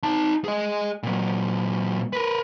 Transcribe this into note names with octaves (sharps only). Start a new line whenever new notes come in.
D#4 A5
G#4 D#5
A#2 F#3
A#4 B4